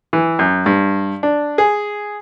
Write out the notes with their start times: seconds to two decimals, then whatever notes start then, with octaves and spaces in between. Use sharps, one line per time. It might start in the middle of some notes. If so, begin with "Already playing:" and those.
0.13 E3
0.39 F#2
0.66 G2
1.23 D4
1.58 G#4